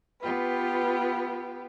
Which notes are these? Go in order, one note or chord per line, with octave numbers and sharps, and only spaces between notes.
B3 F4 G4 B4